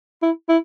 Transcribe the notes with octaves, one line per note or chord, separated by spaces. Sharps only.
E4
E4